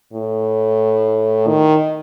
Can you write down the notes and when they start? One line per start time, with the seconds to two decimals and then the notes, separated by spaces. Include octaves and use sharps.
0.13 A2
1.48 D#3